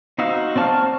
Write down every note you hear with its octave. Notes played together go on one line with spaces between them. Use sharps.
C4 D#4 F#4 F5 E6
C4 D5 A5 C#6 F6